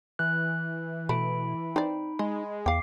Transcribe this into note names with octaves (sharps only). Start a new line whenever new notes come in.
E3 F#6
B2 A3 B5 D7
C4 D#4 D5
G#3 D#5
E2 F5 G5 D6 C7